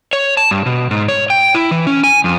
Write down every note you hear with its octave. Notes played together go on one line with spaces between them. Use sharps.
C#5
A5
G2
B2
G#2
C#5
G5
E4
E3
C#4
G#5
F2